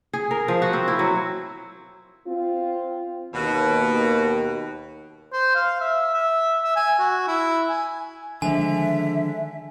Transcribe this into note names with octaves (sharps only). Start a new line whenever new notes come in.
G#4
A#4
F3
F#4
C4
E4
F#3
C4 F4
D#2 B2
C5
F5
E5
E5
E5
G#5
F#4
E4
G#5
D3 D#3 F3 G#3 E5 G#5